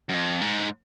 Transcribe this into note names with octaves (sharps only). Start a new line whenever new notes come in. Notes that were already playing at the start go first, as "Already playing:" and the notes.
F#2
F2
G#2